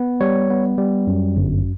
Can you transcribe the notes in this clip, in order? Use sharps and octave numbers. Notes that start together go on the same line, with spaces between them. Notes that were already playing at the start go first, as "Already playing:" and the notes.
Already playing: B3
G3 C#5
B3
G3
F#2
G1